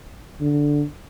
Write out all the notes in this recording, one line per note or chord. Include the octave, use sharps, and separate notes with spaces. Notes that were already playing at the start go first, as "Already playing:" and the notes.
D3